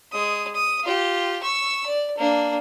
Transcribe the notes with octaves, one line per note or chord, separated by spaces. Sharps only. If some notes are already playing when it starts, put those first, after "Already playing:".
G#3 D#6
D#6
F4 G4
C#6 E6
D5
A#3 D4